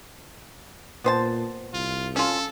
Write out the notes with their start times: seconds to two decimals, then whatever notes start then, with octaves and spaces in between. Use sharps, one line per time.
1.04 A#2 B3 C5 A5
1.74 C2 F4
2.16 C#4 F4 A4